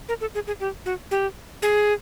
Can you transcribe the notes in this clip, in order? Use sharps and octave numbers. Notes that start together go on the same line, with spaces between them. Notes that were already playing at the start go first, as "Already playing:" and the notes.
A#4
A4
G#4
G#4
G4
F#4
G4
G#4